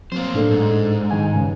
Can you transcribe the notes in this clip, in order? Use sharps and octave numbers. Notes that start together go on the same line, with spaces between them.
F#3 A#3 C4 C5
A2 D4 A4
G#2
D#3 G#3 G#5
G2 C#3